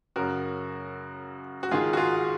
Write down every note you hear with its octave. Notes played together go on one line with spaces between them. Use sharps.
F#2 C#3 F#4 A#4
F#4
G#2 D#3 F4 G#4
F#4
F4 G#4